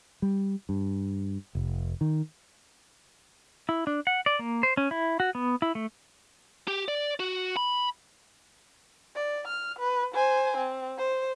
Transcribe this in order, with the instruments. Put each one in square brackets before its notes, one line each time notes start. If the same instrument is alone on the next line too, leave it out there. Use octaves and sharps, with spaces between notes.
[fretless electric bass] G3
G2
F1
D#3
[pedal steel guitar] E4
D4
F#5
D5
A#3
C5
C#4
E4
F#4
B3
E4
A3
[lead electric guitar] G4
D5
F#4
B5
[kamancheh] D5
F6
B4
C5 G#5
C4
C5